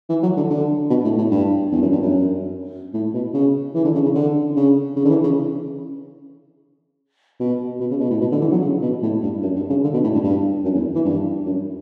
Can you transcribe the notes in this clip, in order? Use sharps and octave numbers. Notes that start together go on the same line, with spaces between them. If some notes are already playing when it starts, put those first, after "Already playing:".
E3
F#3
D3
D3
B2
A2
A2
G2
E2
F#2
G2
F#2
A2
B2
C#3
E3
D3
C#3
C#3
D3
C#3
C#3
D3
E3
C#3
B2
B2
C#3
B2
A2
B2
D3
E3
F#3
C#3
B2
A2
G2
F#2
G2
C#3
D3
B2
A2
G2
G2
F#2
E2
E3
G2
F#2